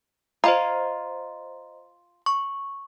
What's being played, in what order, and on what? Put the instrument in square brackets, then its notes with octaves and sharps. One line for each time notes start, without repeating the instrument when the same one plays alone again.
[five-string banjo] F4 [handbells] C5 D#5 A#5
[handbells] C#6